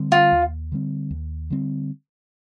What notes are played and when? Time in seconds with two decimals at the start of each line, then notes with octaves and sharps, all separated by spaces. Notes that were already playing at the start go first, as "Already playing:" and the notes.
Already playing: D3 G3 C4
0.12 F4
0.32 D#2
0.72 D3 G3 C4
1.11 D#2
1.50 D3 G3 C4